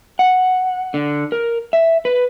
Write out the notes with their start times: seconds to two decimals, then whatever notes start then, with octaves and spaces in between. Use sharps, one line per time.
0.19 F#5
0.94 D3
1.32 A#4
1.73 E5
2.05 B4